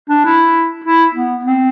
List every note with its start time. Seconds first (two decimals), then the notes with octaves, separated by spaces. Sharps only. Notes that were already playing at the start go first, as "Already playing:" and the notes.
0.09 D4
0.25 E4
0.84 E4
1.14 B3
1.45 C4